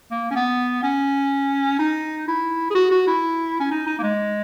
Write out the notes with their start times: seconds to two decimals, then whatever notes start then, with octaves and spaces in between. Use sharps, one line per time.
0.11 A#3
0.31 C#4
0.35 B3
0.83 C#4
1.79 D#4
2.28 E4
2.70 G#4
2.75 F#4
2.91 F#4
3.07 E4
3.60 C#4
3.71 D#4
3.87 D#4
3.99 A#3
4.03 G#3